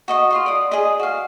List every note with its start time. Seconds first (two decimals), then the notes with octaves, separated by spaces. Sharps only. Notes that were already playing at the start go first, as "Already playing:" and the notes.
0.08 F#4 D#5 C#6
0.30 F4 C6 C#6
0.46 D5 D#6
0.71 G#4 D#5
0.99 F#4 F5